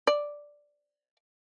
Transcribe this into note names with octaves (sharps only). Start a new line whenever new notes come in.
D5